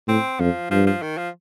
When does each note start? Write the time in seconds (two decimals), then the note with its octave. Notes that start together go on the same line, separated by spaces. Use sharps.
0.08 A2 C4
0.39 F2 F3
0.71 G2 F3
0.87 F3
1.02 D#3
1.17 F3